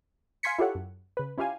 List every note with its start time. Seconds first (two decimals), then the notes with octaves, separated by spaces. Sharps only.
0.43 F5 G#5 C6 G#6 B6 C#7
0.59 E4 F4 G4 A4 C#5 F#5
0.75 F#2
1.17 C#3 B4
1.38 C#4 E4 F4 G4 F5 G#5